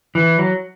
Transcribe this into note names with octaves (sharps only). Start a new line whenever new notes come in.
E3
F#3